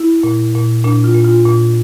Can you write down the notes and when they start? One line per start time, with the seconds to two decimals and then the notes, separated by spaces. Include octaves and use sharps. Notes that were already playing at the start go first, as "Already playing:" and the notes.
Already playing: E4
0.23 A#2
0.55 A#2
0.84 A#2 D4
1.04 F4
1.15 A#2
1.25 F4
1.45 A#2